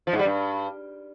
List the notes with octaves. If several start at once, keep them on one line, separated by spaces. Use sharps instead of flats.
F3
G#2
G3
G2